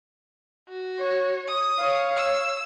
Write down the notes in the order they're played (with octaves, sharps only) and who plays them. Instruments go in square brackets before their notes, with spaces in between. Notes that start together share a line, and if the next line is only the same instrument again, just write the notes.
[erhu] F#4
[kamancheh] C#5
[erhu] D#6
[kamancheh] C#5 F5
[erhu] E6